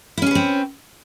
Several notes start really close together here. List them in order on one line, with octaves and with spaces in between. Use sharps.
E4 C#4 G#4 B4 C4